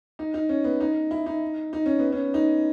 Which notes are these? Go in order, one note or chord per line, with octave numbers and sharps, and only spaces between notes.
D#4
D#4
C#4
B3
D#4
E4
D#4
D#4
C#4
B3
C#4
D#4